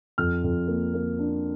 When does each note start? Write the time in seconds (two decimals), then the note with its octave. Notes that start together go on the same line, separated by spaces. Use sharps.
0.18 F2 F6
0.44 F2
0.68 A#3
0.94 A#3
1.19 D4